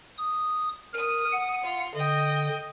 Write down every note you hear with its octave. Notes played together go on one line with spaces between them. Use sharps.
D#6
A#4 D#6 D#7
F#5
F4
D3 D#5 G5